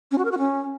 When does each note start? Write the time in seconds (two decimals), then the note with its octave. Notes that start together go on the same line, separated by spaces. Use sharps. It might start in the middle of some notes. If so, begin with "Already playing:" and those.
0.11 C#4
0.18 F#4
0.25 A#4
0.32 F#4
0.38 C#4